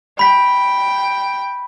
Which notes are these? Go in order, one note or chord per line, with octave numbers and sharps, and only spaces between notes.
G5 B5 B6